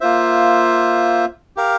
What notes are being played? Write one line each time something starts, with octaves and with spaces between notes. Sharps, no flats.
A#3 F4 C5 E5
G4 A#4 F5